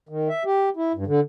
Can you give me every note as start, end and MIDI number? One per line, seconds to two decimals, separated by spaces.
0.09 0.29 51
0.29 0.43 76
0.45 0.69 67
0.76 0.92 64
0.94 1.04 43
1.07 1.20 50